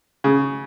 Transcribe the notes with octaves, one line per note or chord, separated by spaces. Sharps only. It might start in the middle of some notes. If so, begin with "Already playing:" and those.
C#3